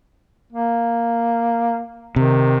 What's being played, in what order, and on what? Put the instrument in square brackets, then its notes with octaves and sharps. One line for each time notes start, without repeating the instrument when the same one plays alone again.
[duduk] A#3
[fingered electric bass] C3 [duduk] D#3